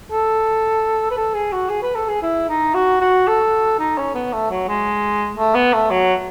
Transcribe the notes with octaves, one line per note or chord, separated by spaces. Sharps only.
A4
B4
A4
G#4
F#4
G#4
B4
A4
G#4
E4
D#4
F#4
F#4
A4
D#4
C#4
B3
A3
F#3
G#3
A3
B3
A3
F#3